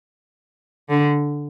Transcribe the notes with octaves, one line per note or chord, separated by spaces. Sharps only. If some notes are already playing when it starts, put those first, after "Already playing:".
D3